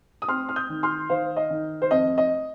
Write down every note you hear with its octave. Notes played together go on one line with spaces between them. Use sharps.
D#6
C4 C6 F6
F6
D#6 G6
D#3
C6 F6
D#3 C5 F5
D#5
D#3
C5
F2 D#5
D#5